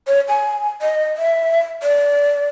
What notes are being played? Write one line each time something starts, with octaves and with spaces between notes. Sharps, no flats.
C#5
G#5
D#5
E5
D5